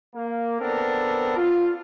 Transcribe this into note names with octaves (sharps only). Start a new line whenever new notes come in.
A#3
B3 C4 D4 A4 A#4
F4